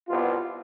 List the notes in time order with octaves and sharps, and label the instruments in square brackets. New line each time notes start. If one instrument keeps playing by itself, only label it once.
[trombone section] C2 B2 G3 B3 F4